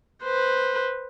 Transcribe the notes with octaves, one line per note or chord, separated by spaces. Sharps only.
B4 C5